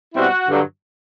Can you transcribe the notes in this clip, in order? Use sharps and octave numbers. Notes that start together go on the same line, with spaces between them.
B2 G3 C4 E4 F#4
G2 D3 F#3